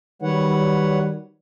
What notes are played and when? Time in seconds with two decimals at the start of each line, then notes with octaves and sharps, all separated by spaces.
0.22 D#3 F#3 G3 B4 C#5 F#5